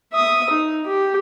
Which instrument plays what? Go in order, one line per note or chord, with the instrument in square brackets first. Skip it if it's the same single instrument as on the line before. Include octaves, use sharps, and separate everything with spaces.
[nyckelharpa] E5 D#6
D#4
G4